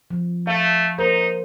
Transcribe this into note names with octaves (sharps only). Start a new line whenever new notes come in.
F3
A3 F5
D#4 A#4 C5